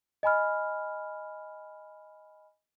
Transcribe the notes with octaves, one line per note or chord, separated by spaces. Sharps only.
D#5 G#5 B5 F6